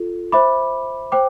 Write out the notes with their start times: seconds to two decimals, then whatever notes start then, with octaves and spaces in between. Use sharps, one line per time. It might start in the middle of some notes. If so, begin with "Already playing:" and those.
Already playing: F4 A4
0.32 C5 E5 B5 D6
1.12 C5 G5 D6